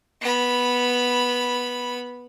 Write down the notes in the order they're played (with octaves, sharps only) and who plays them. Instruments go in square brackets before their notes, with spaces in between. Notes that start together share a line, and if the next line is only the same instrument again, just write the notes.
[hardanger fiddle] B3 B5